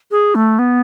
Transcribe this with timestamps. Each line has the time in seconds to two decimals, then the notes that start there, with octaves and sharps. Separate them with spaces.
0.11 G#4
0.35 A3
0.59 B3